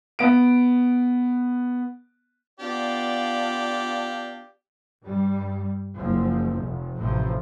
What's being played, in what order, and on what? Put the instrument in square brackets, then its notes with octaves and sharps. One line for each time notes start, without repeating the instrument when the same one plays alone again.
[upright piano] B3 D7
[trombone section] B3 D4 F4 [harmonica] G4 D5 F5
[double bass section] G2 G3
F#1 F3
F1
A1 A2 C3 F3